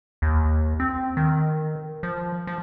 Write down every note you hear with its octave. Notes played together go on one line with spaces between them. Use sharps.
D#2
C4
D#3
F3
F3